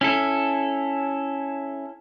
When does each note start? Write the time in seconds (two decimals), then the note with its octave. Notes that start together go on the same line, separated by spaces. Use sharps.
0.01 C#4 E4 A4